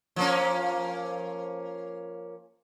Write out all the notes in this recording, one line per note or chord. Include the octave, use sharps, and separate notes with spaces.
F3 A#3 C#4